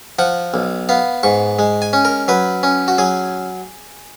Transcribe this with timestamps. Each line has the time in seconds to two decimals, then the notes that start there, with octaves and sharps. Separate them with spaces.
0.19 F3 F#5
0.54 B1
0.89 B3 F5
1.23 G#2 C#6
1.59 G#3
1.82 G#5
1.93 C#4
2.05 A#4
2.28 F#3 B4
2.63 C#4
2.88 F#4
2.98 F#3 G#4